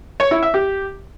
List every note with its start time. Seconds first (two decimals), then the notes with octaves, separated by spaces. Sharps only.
0.20 C#5
0.31 E4
0.42 E5
0.54 G4